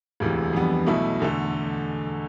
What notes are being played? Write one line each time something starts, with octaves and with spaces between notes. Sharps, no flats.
E1 D2 C3 E3
F2 E3 G3 B3 D4
B1 B2 A3 E4
E2 D3 A3